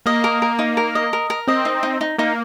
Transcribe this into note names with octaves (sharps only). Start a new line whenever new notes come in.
A#3 D#5
A#4
A#4
D#4
A#4
D#5
A#4
A#4
C4 D#5
D#4
D#4
D#4
A#3 D#4